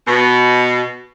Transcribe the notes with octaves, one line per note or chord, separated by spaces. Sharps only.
B2